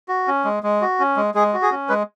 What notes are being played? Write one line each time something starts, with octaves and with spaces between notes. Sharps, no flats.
F#4
C#4
G#3
G#3
F#4
C#4
G#3
G#3 G#4
F#4
G#4
C#4
G#3 B4